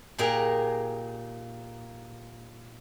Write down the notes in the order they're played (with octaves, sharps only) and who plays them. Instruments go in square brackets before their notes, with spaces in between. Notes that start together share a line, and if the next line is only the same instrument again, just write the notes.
[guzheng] A#2 D#4 G4 G#4 A#4